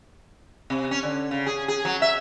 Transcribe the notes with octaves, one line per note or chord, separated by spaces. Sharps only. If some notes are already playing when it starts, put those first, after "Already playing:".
C3
C#4
D3
C#3
G#4
G#4
F#3
E5